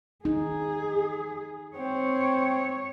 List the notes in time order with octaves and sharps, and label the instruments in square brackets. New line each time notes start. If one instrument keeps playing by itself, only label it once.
[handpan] D#4 [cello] G#4
[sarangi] C4 [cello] C#5